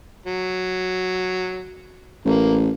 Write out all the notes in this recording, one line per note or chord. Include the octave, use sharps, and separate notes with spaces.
F#3
A1 A#3